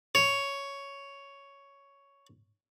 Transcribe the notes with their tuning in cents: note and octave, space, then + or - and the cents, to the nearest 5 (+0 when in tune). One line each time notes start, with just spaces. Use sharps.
C#5 +5